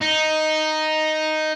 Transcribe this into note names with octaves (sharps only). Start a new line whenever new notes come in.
D#4